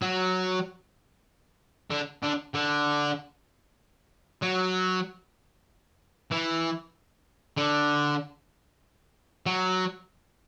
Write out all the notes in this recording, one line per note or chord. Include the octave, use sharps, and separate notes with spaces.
F#3
D3
D3
D3
F#3
E3
D3
F#3